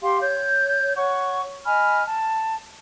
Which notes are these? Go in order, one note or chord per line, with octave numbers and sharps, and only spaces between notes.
G4 F5 G5 C6
C#5 G6
C#5 F#5 C#6
D#5 G#5 B5 F6
A5